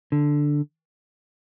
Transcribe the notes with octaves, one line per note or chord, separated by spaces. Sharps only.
D3